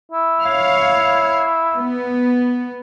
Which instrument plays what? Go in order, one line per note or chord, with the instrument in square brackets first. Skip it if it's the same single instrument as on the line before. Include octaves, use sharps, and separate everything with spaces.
[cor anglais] E4
[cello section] C#5 F5
B3